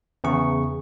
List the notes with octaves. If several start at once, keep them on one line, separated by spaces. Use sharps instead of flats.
E2 C#3 C#6